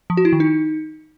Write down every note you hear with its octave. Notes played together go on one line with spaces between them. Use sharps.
F3
F#4
E4
D#3
D#4